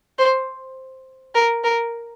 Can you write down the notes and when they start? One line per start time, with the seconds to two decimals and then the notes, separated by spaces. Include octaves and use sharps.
0.18 C5
1.35 A#4
1.64 A#4